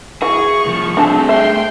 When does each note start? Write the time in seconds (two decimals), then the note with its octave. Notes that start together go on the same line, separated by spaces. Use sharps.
0.22 E3 F#4 G#4 C#6
0.66 C2 F3
0.97 A3 C4 D4 F#4 G#4 A5
1.29 E5 G5 C6